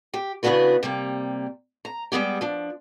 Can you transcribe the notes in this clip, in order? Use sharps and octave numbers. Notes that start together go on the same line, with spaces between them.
G4
C#3 E3 B3 D4 F#4 B4
C3 G3 A#3
A#5
G3 G#3 B3 G4
F3 D4